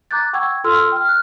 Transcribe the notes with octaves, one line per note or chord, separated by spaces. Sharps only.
A#5 D6 F#6 G6 A6
F#5 G5 C#6 E6 G#6
F4 A4 C6 E6 F6
G5 F6
F6 F#6